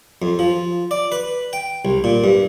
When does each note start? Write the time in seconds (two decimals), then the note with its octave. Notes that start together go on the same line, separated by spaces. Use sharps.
0.22 F2
0.39 F3
0.91 D5
1.12 B4
1.53 G5
1.85 C2
2.04 A#2
2.24 G2